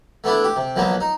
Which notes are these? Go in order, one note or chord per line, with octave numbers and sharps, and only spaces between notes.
A3 B3 D4 E4
G4
C3
B1 F3 F#3 A#3 B3
D#4